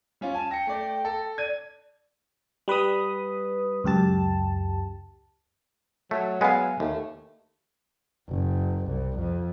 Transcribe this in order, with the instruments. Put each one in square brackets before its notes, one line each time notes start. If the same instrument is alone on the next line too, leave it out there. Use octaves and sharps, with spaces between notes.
[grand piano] G3 C#4 F4
[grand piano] G#5 [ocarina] A5
[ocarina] G5 [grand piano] A#6 C#7
[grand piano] A3 D5
A4
[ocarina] D5 [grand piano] G#6 D#7
[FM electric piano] G3 B4 B5 D#6
C#2 F#2 G4 A5
[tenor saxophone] F#3 [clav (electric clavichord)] A3
[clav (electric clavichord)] G#3 B3 [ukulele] F5 G#5
[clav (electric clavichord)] D#2 [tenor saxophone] A3
[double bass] F#1
C2
F2